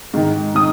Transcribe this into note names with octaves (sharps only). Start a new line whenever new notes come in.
G#2 D#3
D#3 D#6